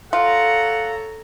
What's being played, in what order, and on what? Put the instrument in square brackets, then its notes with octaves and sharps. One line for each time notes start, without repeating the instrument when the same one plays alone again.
[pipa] F4 [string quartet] A4 C#5 A#5 [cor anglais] F#5